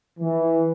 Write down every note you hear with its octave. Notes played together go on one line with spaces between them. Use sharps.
E3